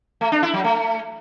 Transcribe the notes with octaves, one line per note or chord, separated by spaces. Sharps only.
A3
D4
E4
F#3
A3